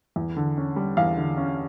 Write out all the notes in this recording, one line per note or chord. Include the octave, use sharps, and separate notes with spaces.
E2
D3
C#4
G3
E2 F5
D3
C#4